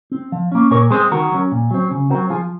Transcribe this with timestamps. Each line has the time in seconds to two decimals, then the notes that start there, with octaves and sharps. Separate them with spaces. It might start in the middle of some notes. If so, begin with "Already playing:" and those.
0.12 C4
0.32 F3
0.52 A#3 C#4
0.71 A#2 A#4 C#5
0.91 G#3 C4 G#4 C5
1.11 D#3 F#4 A#4
1.32 F#3 C#4
1.52 A#2
1.71 F#3 C4
1.91 C#3
2.10 C4 F#4 A#4
2.15 F#3
2.30 F3 F4 G#4